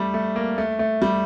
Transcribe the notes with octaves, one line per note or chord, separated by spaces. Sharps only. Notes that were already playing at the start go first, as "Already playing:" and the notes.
Already playing: G3 A3
A3
A#3
A3
A3
G3